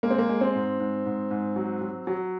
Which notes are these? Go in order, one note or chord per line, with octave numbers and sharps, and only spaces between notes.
G#3 A#3
C4
A#3
G#3
C4
G#2
G#2
G#2
G#2
F#3
F#3
F#3